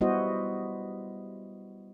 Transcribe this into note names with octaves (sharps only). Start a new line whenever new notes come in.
G3 B3 E4 F#4 C5 D#5